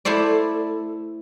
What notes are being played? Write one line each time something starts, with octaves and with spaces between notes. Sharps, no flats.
A3 E4 A4 C5 D5